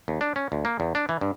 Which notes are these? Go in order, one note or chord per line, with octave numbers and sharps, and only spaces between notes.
D#2
D4
C#4
D2
A#3
E2
D4
E3
G2